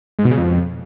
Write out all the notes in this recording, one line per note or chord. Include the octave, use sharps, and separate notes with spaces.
G#2
B2
C#3
F2